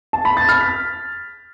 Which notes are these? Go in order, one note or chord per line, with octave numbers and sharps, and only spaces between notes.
A5
B5
A6
F6
B6